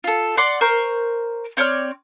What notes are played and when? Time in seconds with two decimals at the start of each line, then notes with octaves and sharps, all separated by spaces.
0.04 F4 A4
0.37 D5 F#5 C6 D6
0.61 A#4 C5 A#5 C#6
1.57 C4 C#5 D5 F6